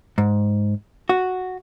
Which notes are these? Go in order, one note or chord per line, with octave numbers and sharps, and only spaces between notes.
G#2
F#4